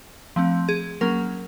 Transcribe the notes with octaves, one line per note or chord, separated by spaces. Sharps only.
F3 A3 C4
G#4
F#3 A#3 C#4 A#4